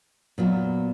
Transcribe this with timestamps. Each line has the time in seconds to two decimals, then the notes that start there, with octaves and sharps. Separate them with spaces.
0.38 A#2 F#3 B3